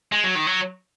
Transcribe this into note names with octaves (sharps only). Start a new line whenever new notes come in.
G#3
F#3
D#3
F#3